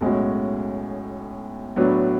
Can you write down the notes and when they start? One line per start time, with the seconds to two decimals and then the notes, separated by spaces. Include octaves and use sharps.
0.01 B1 A2 G#3 C#4 F#4
1.76 A2 F#3 B3 D4 F#4